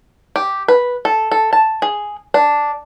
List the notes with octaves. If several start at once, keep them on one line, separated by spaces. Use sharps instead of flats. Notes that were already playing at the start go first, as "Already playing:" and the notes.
G4
B4
A4
A4
A5
G#4
D4